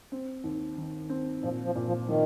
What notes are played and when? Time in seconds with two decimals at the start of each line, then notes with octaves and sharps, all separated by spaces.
0.12 C4
0.44 D#2
0.78 D#3
1.10 C4
1.43 A#2 F3
1.65 F3
1.75 A#2
1.87 F3
2.08 D#3 F3